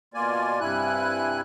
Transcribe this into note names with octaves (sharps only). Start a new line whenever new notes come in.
B2 A#3 F4 D5 G#5
G2 C3 G3 E4 G#5 F#6